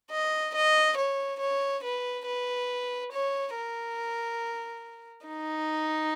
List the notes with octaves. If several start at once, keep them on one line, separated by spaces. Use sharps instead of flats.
D#5
D#5
C#5
C#5
B4
B4
C#5
A#4
D#4